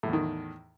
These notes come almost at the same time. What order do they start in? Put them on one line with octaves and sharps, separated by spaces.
A2 E2 D#3